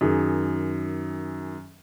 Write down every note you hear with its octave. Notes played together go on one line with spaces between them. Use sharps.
F#2 D#3 G#4